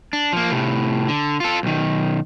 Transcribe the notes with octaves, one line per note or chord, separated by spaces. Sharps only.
D4
F3 A#3
A2 C3
D3
F4 A4
B1 D#3